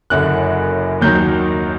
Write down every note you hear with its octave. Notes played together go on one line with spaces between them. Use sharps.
F#1 F#2 D3 F#6
D#2 D#3 F#3 G6